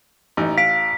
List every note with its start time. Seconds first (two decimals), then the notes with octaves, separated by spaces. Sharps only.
0.37 A1 D#4
0.58 F5 B6 D7